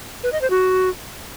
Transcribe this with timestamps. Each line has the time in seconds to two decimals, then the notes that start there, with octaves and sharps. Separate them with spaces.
0.23 B4
0.32 D#5
0.41 C5
0.50 F#4